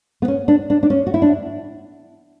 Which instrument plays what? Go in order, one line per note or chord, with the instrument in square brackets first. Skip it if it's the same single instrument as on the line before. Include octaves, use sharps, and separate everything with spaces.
[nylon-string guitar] B3
C#4
D4
D4
D4
C#4
F#4
E4
D4